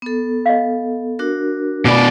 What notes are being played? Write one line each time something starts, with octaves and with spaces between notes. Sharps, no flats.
B3 A4
D#5 F5
D4 F#4 A#4
B2 D4 F4 D5 G#5 D6